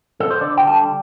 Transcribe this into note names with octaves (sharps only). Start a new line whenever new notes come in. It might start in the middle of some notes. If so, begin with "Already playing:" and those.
A4
C5
D3 D5
G5
G3 A5